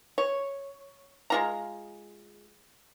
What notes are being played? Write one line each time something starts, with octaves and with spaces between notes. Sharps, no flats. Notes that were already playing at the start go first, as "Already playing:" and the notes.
C#5
G#3 F4 A#5